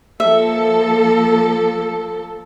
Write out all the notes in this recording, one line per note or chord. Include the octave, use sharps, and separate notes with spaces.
F3 A#3 A4 E5